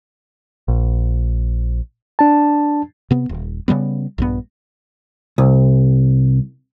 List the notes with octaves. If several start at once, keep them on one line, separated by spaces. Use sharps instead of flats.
A#1
D4 A5
C3 B3
D#1
C#3 F#3 G3 B3
A#1 G2 B3
C2